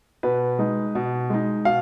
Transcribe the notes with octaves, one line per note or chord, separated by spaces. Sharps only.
B2 B4
G#3 D#4
B2
G#3 D#4
B2 F5